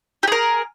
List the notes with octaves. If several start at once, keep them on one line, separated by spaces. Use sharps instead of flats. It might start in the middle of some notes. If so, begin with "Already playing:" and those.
G4 G#4 A#4